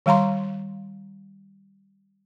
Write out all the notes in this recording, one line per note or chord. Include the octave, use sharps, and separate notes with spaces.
D#3 G3 F5 A#5 C6